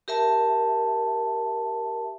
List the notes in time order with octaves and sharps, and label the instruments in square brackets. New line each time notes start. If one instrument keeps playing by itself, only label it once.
[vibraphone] G4 A#4 E5 A5